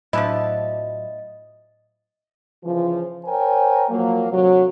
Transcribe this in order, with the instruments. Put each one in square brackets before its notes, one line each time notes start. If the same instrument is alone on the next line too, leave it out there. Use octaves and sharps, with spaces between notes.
[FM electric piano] A2 F#3 [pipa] F3 D4 E4 [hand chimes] D#5
[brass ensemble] C#3 E3 F3
A#4 C5 C#5 G5 G#5
F3 F#3 A#3
D2 C3 F#3